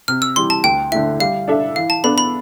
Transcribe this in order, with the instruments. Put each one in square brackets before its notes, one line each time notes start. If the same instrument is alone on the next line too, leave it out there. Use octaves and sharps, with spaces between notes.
[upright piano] C3 [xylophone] F6
[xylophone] E6
[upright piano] E3 G3 [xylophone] C6
[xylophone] A5
[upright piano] D2 [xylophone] G5
[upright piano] D3 A3 E4 [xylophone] E5
[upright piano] G3 [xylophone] F5
[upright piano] D4 A4 E5
[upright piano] E3 [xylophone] F5
[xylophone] A5
[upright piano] B3 D4 A4 [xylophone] B5
[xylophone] B5